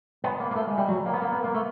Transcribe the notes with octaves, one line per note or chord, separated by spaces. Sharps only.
B3
A#3
A#3
A3
G#3
G3
F#3
A#3
B3
A#3
B3
A#3
A3